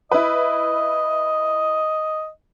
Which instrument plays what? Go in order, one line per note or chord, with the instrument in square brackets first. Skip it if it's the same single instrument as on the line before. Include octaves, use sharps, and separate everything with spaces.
[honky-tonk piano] E4 B4 [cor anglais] D#5